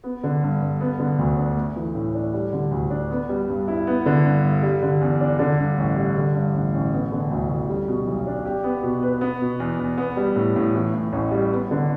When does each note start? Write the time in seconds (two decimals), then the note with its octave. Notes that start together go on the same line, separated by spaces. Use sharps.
0.04 B3
0.23 D3
0.43 G2
0.61 G2
0.81 B3
0.99 D3
1.19 D2
1.37 D4
1.57 A3
1.76 E3
1.95 A2
2.15 D4
2.34 G3
2.52 D3
2.71 D2
2.90 D4
3.10 B3
3.29 G3
3.49 G2
3.68 E4
3.87 B3
4.06 D3
4.25 G2
4.43 G2
4.63 G3
4.82 D3
5.01 E2
5.21 D4
5.39 D3
5.59 G2
5.78 A1
5.97 G3
6.16 D3
6.35 G2
6.54 A1
6.74 A1
6.93 B3
7.12 D3
7.31 D2
7.50 D2
7.69 G3
7.88 B2
8.07 B1
8.27 D4
8.46 G4
8.64 B3
8.83 B2
9.03 B4
9.21 B3
9.41 B2
9.60 E2
9.79 E2
9.98 B3
10.17 G3
10.36 A2
10.56 A2
10.74 E3
10.94 A2
11.12 A1
11.31 G3
11.52 B3
11.71 D3